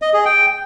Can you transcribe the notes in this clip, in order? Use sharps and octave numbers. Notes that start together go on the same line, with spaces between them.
D#5
G#4
G5